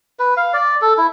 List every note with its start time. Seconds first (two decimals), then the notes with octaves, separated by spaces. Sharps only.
0.19 B4
0.37 F5
0.53 D5
0.82 A4
0.98 E4